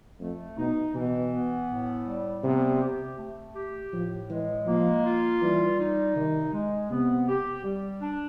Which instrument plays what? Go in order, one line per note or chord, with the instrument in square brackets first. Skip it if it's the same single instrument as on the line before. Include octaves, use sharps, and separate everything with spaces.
[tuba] F2 [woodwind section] A3
[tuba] B2 [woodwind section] D#4
[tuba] B2 [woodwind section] E3
[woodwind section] B3
A2
G3
[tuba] C3 [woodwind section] B3
[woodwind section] G4
A3
G4
[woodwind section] A2 [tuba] F3
[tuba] E3 [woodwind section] G#3
[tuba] F3 [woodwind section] A#3
[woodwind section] F4
[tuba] E3 [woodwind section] G3
[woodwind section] D#4
[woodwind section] C3 [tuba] D#3
[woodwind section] G#3
[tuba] C3 [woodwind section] B3
[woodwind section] G4
G3
D4